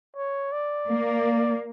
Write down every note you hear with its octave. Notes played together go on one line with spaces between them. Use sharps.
C#5
D5
A#3